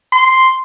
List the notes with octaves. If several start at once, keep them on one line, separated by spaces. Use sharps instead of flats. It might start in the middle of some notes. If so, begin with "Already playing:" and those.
C6